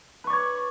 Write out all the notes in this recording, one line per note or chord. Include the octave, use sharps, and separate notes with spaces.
B4 C#5 D5 C#6